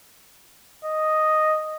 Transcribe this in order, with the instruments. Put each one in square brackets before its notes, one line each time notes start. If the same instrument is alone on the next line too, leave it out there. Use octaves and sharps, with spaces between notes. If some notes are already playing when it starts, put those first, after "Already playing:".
[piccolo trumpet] D#5